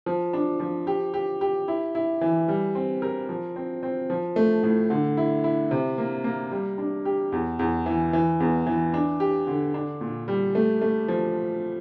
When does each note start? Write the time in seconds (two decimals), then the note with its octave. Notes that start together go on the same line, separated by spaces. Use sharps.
0.06 F3
0.33 D4
0.60 F3
0.87 G4
1.14 G4
1.41 G4
1.68 E4
1.95 E4
2.21 E3
2.48 G3
2.75 C4
3.02 A#4
3.29 F3
3.56 C4
3.83 C4
4.10 F3
4.36 A3
4.63 A2
4.90 D3
5.17 E4
5.44 E4
5.71 C3
5.98 A#3
6.24 A#3
6.52 G3
6.78 D4
7.05 G4
7.32 E2
7.59 E2
7.86 E3
8.13 E3
8.40 E2
8.66 E3
8.94 D4
9.20 G4
9.47 D3
9.74 D4
10.01 A#2
10.28 G3
10.55 A3
10.82 A3
11.08 F3